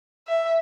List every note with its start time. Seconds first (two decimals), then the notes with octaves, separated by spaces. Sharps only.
0.27 E5